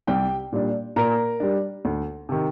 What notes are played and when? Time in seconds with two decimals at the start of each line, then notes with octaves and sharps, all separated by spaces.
0.07 C2 G4 G5
0.52 A#2 G3 D4
0.96 A#2 A#4 A#5
1.40 G3 D4
1.85 D2
2.29 C3 D#3